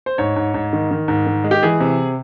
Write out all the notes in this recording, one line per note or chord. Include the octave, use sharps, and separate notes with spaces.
C5
G#2 C#5
G#2
G#2
D#3
D#3
G#2
D#3
G#3
G4
E3 G#4
C3